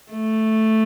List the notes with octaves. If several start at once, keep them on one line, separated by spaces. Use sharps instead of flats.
A3